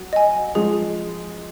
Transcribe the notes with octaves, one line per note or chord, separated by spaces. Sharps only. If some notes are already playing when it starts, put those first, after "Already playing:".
Already playing: F#3
D#5 G#5
F3 G#3 G#4